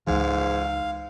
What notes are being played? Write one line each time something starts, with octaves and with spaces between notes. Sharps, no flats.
C#2 G#2 E3 F5